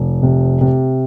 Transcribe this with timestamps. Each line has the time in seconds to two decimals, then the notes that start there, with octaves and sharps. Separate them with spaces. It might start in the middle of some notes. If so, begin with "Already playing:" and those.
Already playing: F1
0.23 C3
0.61 C3